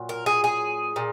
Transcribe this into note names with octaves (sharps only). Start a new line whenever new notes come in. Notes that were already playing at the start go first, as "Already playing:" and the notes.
Already playing: A#2 F#3
A#4
G#4
G#4
A#2